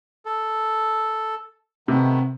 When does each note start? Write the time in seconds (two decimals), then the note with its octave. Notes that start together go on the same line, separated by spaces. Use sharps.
0.26 A4
1.88 C3 D#3 A3 B3